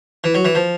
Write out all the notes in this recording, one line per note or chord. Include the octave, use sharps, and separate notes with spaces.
E3
F#3
E3
F3